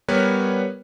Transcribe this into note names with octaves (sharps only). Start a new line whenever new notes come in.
G3 B3 A#4 B4 C#5